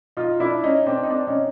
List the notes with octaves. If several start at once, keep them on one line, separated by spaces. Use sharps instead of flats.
D#4 F4
D4 E4
C#4 D#4
C4 D4
D#4
C4 D4
C#4 D#4